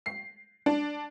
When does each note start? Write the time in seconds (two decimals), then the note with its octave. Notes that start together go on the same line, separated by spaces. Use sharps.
0.06 C7
0.66 D4